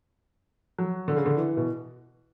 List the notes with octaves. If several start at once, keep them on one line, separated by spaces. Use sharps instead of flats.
F#3
D3
C#3
D3
E3
B2